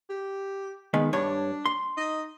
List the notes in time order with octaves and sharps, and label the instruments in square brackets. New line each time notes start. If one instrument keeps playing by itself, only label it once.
[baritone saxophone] G4
[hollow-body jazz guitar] D#3 G#3 B3
[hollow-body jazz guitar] G2 C#5 [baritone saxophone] D4
[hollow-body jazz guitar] C6
[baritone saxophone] D#4